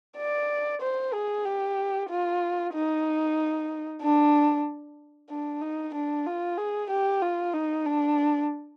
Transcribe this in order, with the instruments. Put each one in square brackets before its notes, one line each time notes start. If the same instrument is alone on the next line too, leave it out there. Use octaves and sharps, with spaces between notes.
[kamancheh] D5
C5
G#4
G4
F4
D#4
D4
D4
D#4
D4
F4
G#4
G4
F4
D#4
D4